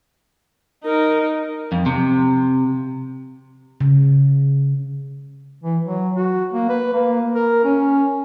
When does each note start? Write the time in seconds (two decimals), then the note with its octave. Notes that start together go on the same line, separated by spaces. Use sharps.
0.84 D#4 A#4
1.72 F2
1.86 C3
3.81 C#3
5.64 E3
5.85 F#3
6.16 F#4
6.53 A#3
6.69 B4
6.94 A#3
7.35 A#4
7.64 C#4